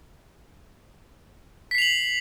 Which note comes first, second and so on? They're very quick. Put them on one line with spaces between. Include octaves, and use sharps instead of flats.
B6 C7 F7 F#7